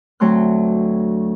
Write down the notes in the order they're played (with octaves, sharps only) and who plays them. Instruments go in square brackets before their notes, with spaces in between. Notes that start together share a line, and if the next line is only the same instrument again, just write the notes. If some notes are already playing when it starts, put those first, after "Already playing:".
[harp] D2 F#3 A3 C4 C6 F#6